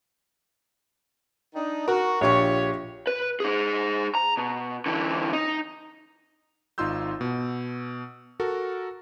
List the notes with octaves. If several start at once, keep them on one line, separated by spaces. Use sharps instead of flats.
D4 D#4
F#4 A#4
A#1 F4 G4 C#5 C#6
B4
D#4 G#4
A#5
B2
D3 E3
D#4
G#1 D#4 F4 C6 E6 G6
B2
F#4 A4 A#4